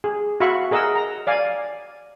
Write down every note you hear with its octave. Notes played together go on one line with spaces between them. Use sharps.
G#4
F#4 E5 F5 B5 C#6
G#4 A#4 D#5 F#5 E6
A#5
D5 F5 G#5